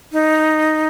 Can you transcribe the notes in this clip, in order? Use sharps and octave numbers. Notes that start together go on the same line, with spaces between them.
D#4